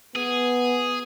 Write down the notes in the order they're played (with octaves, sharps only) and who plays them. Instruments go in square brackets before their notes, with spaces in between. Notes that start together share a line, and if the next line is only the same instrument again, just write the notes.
[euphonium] B3 [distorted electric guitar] G#4